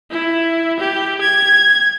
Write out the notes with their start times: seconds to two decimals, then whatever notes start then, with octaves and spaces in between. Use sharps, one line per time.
0.11 E4
0.79 G4
1.21 G#6